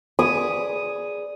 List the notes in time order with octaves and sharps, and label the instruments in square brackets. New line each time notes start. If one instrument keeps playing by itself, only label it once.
[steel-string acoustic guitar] G#4 B4 [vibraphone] D5 [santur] D#6